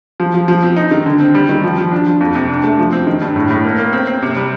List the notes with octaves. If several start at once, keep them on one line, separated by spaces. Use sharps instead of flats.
F3
F3
F3
C4
D#4
D#3
D3
C4
G3
D#3
F3
F3
D4
F3
F2
C3
D4
A3
F3
C4
D#3
G2
A2
A2
A#3
A#3
C4
C4
C3
G3